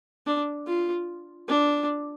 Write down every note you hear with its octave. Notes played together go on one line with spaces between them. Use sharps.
D4
F4
D4